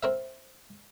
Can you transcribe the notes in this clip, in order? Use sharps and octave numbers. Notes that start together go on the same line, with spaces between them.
C4 A#4 E5